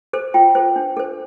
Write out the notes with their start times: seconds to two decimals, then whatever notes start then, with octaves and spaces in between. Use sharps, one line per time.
0.13 A4 C5
0.34 F4 G5
0.55 A4 C5
0.76 D4
0.97 A4 C5